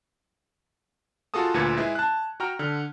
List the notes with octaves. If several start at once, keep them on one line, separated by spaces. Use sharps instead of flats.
F4 F#4 G#4 A4 A5 D#6
D2 A#2 F4 B4 G#6 C#7
G#3 E4 G#4 B4
A5 F#6
F#4 G5 A#5 F6
D3 F6